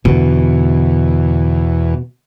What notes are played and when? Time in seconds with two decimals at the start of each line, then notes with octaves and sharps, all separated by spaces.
0.05 E2 B2 D3